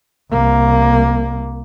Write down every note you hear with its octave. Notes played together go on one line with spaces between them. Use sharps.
C2 A#3